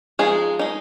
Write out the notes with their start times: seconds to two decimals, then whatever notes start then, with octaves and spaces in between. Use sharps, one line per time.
0.19 F3 G#3 D#4 G#4
0.59 G#3 D#4